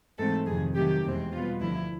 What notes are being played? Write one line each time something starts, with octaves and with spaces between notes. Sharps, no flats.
G#2 E3 A3 C4 A4
F2 C3 D#3 G#4
C3 D#3 F#3 A3 G4
E2 B2 G#3 C4
B2 G3 B3 F4
D2 D3 F3 E4